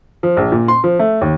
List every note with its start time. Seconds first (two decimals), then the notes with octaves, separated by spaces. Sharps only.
0.23 F3
0.37 A#1
0.52 A#2
0.68 C6
0.84 F3
0.99 A3
1.21 D#2